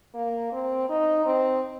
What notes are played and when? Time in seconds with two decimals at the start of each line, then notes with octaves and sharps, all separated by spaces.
0.14 A#3
0.52 C4
0.89 D#4
1.26 C4